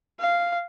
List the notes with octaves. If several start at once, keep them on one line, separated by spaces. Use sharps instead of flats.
F5